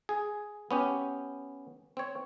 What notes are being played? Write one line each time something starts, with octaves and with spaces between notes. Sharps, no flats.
G#4
B3 C#4 G4
C4 C#5